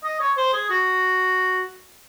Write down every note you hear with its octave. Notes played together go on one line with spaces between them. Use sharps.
D#5
C#5
C5
G#4
F#4